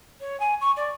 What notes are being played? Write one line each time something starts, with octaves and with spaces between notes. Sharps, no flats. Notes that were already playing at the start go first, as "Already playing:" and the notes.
C#5
G#5
C#6
D5